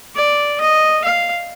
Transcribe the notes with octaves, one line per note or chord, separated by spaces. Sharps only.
D5
D#5
F5